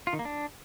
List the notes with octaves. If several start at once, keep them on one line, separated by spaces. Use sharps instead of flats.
F4
D#3
A#3
D4